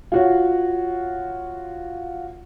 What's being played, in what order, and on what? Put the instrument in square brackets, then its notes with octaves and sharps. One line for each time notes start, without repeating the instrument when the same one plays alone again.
[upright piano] F4 F#4 C#5